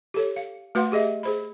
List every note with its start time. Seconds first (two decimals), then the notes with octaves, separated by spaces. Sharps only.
0.14 G4 A4 C#5
0.36 F5
0.75 A3 F#4 B4 F5 F#5 C6
0.92 G4 G#4 D#5 E5
1.23 G#4 C5 B5